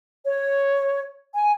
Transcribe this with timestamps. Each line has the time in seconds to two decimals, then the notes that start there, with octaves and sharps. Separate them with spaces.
0.24 C#5
1.34 G#5